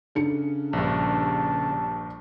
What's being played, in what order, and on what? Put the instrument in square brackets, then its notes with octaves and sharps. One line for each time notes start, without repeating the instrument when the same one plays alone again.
[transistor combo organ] C#3 [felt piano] D4 A4 C#7
[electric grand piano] A#1 G2 [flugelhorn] A5